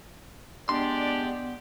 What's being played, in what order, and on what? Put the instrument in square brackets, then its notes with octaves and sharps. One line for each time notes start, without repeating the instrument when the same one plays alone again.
[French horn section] G#3 G4 D5 [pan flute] B3 [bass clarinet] D4 [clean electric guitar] C6